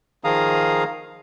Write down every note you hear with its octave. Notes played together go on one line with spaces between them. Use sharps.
D#3 F3 G#4 F5 A#5 D#6